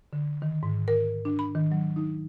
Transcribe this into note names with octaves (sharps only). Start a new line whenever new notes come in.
D3
D#3
G#2
A#4
D4
B5
D#3
F#3
D#4